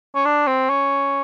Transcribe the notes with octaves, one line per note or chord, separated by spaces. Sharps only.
C#4
D4
C4
C#4